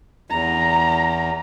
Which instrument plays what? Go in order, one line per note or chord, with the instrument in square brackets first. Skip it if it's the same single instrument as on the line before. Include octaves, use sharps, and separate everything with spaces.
[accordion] E2 [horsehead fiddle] A#5